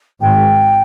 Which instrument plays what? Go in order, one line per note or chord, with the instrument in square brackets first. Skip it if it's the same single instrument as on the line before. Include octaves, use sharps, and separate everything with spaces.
[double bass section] G#1 G#2 [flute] G5